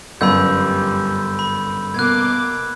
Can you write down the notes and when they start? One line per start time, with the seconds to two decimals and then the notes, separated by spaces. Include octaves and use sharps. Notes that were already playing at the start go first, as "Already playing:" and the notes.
0.21 G1 F#2 G3 B5 E6 G6
1.39 B5
1.94 B2 A#3 D6 F#6 G#6